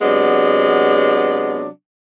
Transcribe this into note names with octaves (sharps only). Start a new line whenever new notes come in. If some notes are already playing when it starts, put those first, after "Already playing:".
C3 F#3 G#3 B3 D4